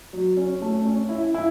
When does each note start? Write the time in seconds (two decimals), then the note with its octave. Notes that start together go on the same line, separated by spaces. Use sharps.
0.13 F#3
0.37 C#4
0.62 A3
0.85 C#4
1.09 E4
1.34 E4